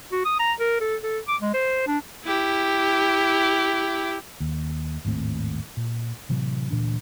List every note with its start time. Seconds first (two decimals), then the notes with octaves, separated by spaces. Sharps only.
0.12 F#4
0.25 D#6
0.40 A#5
0.60 A#4
0.81 A4
1.03 A4
1.28 D6
1.41 G#3
1.54 C5
1.87 D4
2.24 E4 G4
4.40 D#2
5.05 G#1 D#2 A2 C4
5.77 A#2
6.29 A2 C3 E3 F#3
6.70 D2 A#2 E3 D4